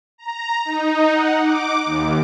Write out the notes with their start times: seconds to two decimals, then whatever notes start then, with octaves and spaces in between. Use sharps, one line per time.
0.18 A#5
0.65 D#4
1.13 F#5
1.44 D6
1.86 D#2